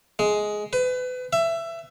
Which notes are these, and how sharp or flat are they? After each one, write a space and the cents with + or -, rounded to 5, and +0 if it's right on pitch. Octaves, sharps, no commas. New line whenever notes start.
G#3 +10
B4 +30
E5 +20